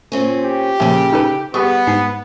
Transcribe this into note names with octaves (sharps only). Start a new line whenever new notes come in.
A#2 C4 C#4
G4
A#2 C#3 F3 C#4 E5
D#4 A4 B4
G3 B3 G4 G#4 C#6
G#2 G#5 C7